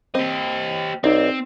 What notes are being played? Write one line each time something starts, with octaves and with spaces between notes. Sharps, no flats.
C4 G4 D#5
B1 C4 D#4 D5